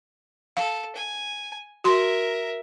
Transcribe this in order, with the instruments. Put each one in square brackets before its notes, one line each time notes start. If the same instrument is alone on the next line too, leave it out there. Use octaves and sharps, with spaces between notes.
[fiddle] A4 [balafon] F5
[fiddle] G#5
[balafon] F#4 C6 [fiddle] A#4 E5